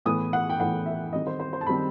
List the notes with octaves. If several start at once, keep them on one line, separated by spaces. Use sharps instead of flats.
A2 E3 B3 D#6
F#5
G5
A2 E3 B3 F#5
E5
D#3 G3 C4 D#5
C5
C5
C5
A5
D#3 G3 C4 B5